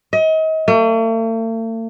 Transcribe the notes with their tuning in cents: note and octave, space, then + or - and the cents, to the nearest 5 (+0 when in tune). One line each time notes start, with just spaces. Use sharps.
D#5 +35
A3 +45